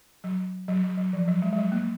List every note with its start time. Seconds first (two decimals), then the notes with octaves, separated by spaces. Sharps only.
0.24 F#3
0.68 F#3
0.83 F#3
0.98 F#3
1.13 F3
1.28 F#3
1.42 G#3
1.52 G#3
1.58 F#3
1.72 A#3